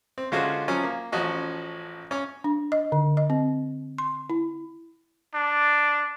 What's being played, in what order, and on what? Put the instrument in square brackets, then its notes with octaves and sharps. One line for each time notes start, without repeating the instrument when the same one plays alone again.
[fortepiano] C4
D3 G#3 C#4 F4 F#4 C5
F3 F#3 C#4
A#3
A1 F3 C#4 F#4 D#5
C#4 C#5
[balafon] D4
D#5
D3
D#5
C4
C6
E4
[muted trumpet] D4